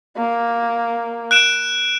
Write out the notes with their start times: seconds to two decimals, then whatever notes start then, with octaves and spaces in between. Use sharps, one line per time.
0.17 A#3
1.31 F#6 D7 E7